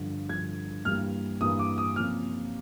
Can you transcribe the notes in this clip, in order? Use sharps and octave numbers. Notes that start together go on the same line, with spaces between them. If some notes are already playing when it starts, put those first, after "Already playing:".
Already playing: G2 D3 F3
G2 D3 F3 G#6
G2 E3 G3 A#3 F6
G2 E3 G3 A#3 D#6
D6
D#6
C3 F3 A#3 C#4 F6